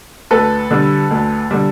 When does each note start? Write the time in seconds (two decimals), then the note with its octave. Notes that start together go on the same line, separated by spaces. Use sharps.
0.31 D2 A4 B4
0.71 D3 G3
1.11 D2
1.51 D3 G3